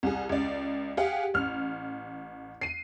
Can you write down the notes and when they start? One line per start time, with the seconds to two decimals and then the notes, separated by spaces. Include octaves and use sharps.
0.03 C2 G#4
0.29 C#2 D5
0.97 G4 G#4 F5 F#5
1.34 A1 F6
2.61 C7 D#7